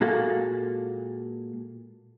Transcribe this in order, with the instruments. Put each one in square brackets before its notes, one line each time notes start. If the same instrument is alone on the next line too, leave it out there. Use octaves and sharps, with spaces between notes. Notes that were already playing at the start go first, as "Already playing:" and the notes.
[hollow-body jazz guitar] A#2 G#3 A#3 F#4 A4 F5